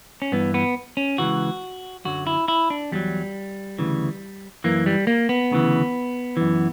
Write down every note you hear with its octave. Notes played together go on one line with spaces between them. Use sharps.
C#4
G2 E3 B3
B3
C#4
C#2 C#3 E3 F#4
F#2 D3 F#3 F#4
E4
E4
D4
E2 D3 F#3 G3
D2 C#3 E3
F#2 E3 A#3
G3
A#3
B3
D2 C#3 E3
F#2 E3